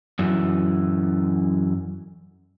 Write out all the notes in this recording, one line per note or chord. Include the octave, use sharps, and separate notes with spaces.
F#2 E3